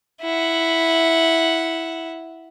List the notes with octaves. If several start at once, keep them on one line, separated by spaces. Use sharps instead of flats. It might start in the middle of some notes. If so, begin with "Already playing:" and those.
E4 F#5